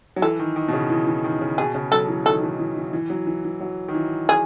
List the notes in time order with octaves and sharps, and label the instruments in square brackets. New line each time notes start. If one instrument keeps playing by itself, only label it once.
[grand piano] F#3
[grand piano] E3 [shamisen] A4
[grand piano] D#3
D#3
B2
C#3
E3
E3
D#3
C#3
[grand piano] B2 [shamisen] G#4
[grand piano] C#3
[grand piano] F#3 [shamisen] A4
[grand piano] E3
[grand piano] D#3 [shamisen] A4
[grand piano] E3
E3
E3
E3
F#3
E3
E3
F#3
D#3
E3
[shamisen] G#4